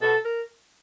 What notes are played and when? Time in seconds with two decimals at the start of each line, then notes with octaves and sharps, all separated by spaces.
0.02 B2 A4
0.25 A#4